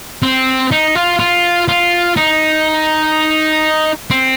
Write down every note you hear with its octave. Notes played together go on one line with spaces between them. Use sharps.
C4
D#4
F4
F4
F4
D#4
C4